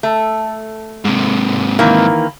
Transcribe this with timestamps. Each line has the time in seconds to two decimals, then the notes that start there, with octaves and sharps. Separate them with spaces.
0.03 A3
1.05 G#2 C3
1.79 D#3 E3 A#3